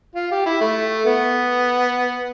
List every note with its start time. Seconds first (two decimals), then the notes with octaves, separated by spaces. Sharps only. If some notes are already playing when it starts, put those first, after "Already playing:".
0.15 F4
0.31 G4
0.46 E4
0.61 A3
1.06 B3